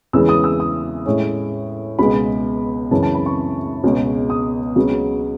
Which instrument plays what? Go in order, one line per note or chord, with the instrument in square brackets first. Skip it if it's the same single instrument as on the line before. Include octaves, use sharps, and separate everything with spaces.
[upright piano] E2 C#3 E3 G#3 E6
D#6
E6
D#6
A2 G#3 C#4
C#2 B2 G#3 B3 B5
F#2 C#3 E3 A5
A5
B5
C#6
C#2 B2 G#3 C#4
D#6
C#2 C#3 F#3 B3